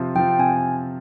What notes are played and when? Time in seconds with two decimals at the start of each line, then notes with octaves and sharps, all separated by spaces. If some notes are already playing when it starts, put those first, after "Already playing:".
Already playing: C3 F3 C4 F4
0.15 F3 C4 F4 G5
0.39 C3 G#5